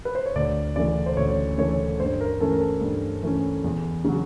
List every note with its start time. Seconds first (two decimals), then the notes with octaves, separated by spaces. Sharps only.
0.05 B4
0.15 C5
0.26 C#5
0.36 D2 D5
0.76 C#3 E3 A3 D5
1.06 C5
1.17 D2 C#5
1.58 C#3 E3 A3 C#5
2.00 G2 C5
2.21 A#4
2.40 E3 A3 C#4 A4
2.52 A#4
2.61 A4
2.81 G2
3.23 E3 A3 C#4
3.64 E2
4.05 C#3 F#3